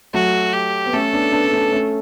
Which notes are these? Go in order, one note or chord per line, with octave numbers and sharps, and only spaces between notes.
F#3 A3 F#4
G4
B3
A3 C#4 A4
B3 D4
B3 D4
D4
A3 C#4
A3 C#4